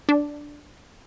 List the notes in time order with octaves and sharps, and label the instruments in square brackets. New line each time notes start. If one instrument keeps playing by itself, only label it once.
[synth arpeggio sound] D4